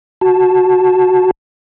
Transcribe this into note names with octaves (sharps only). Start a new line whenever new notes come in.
F#4 A5